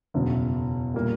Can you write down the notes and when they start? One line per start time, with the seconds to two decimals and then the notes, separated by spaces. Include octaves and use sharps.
0.14 F#1 E2 B2
0.94 A#2 G3 A#3